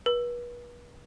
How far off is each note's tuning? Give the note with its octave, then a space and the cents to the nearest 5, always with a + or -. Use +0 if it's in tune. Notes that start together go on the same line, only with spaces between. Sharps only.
B4 -35